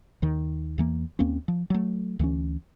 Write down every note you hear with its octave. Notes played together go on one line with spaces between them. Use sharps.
D#2 D#3
E2 E3 A#3
D#2 A#3 C4 C#4
F3
F#3 A3
D2 E3 G3 C#4